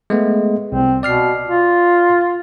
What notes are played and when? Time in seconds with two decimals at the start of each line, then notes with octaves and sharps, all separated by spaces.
0.10 G#3 A3 B3
0.72 C2 C4
1.03 B2 D5 F6 C7
1.47 F4